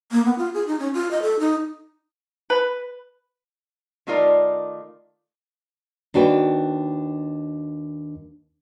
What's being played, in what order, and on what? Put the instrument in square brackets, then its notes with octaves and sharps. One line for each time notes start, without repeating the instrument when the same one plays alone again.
[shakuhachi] A#3
B3
F4
G#4
D#4
C#4
F4
D#5
A4
D#4
[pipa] B4
[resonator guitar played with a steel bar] D#3 A3 D#4 F4 A#4 D5
[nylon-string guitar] D#2 D4 F#4 B4 G5